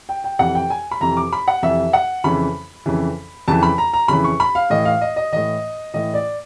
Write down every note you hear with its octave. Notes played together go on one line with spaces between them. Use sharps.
G5
G5
F2 C3 E3 F#5
G5
G#5
B5
F2 C3 E3 A#5
D6
B5
F#5
F2 C3 E3 E5
F#5
F2 C#3 E3 B5
F2 C#3 E3
F2 C#3 E3 A5
B5
A#5
A#5
F2 C#3 E3 B5
C#6
B5
F5
A2 E3 D#5
F5
D#5
D#5
A2 E3 D#5
A2 E3 D#5
D5